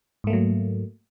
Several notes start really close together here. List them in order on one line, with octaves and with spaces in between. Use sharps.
G#2 A3 A#3 F#3